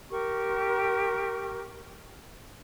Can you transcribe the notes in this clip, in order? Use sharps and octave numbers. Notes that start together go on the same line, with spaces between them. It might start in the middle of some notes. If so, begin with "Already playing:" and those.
G4 A#4 C#6